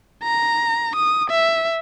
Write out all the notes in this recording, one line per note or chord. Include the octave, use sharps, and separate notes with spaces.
A#5
D#6
E5